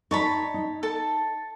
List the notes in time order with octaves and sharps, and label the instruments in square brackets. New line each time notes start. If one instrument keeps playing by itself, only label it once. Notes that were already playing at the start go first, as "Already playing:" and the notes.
[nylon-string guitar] D#4 D5 [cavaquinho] C#5 A5 B5
[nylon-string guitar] D#4
[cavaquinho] A4 A5